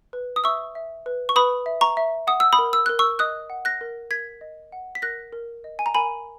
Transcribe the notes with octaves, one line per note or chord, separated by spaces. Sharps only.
B4
D#6
E5 C#6 E6
E5
B4
C#6
B4 B5 D#6
E5
A#5 C#6
E5
F#5 D#6
E6
B5 D#6
A#4
E6
A#4 F#6
C#6 E6
D#5 D#6 F#6
F#5
F#6 A#6
A#4
A#4 G#6 B6
D#5
F#5
B6
A#4 F#6 A#6
A#4
D#5
G#5
A#5
A#4 G#5 B5